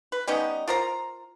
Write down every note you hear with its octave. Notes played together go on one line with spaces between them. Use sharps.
B4
G3 B3 C#4 D#4
F4 A#4 C5 A#5